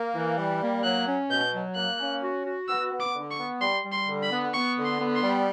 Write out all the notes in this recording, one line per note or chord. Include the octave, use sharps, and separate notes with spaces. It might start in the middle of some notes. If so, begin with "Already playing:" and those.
Already playing: A#3
E3
G3
A#3
F#3 F#6
C#4
B2 G6
F#3
A#3 F#6
C#4
F#4
F#4
B3 E6
B3
D6
D3
C#6
B3
G3 C6
G3
C6
D3
B5
B3
B3 C#6
D3
C6
B3
C6
G3